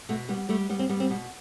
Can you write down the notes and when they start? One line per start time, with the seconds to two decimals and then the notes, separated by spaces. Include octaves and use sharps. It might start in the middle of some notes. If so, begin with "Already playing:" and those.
0.09 B2 A3
0.29 G3 B3
0.49 G3 A3
0.69 G3 B3
0.79 C4
0.89 G3 B3
1.00 C4
1.10 B2